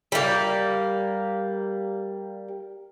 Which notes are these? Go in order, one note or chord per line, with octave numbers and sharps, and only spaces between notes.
G3 A#3